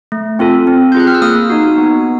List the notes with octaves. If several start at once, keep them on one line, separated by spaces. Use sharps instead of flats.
A3
C4 F4 A4
C4
G6
F4 G#4 F#6
F6
E6
A#3 D#6
D#4 F#4
B3